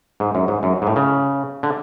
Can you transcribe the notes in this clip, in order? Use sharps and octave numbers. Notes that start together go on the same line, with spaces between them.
G#2
F#2
G#2
F#2
G#2
A2
C#3
D3